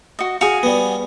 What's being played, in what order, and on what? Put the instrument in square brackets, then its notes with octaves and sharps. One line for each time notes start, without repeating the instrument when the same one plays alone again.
[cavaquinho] F#4 D#5
[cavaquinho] F#4 G#4 [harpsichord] F5
[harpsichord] G3 B3